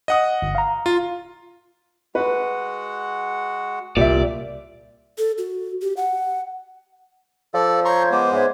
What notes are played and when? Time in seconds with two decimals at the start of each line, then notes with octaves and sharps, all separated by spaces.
0.08 D#5 F#5 D#6
0.42 G1
0.55 F5 A#5
0.86 F4
2.15 G#3 F#4 B4 F#5
3.97 C2 A#2 G4 D5 E5
5.18 A4
5.38 F#4
5.82 G4
5.97 F#5
7.54 F3 A4 D5
7.85 C#5 A#5 C6 C#6 G6
8.11 G#3 B3 C5 D6
8.32 G#2 C#5 D5 E5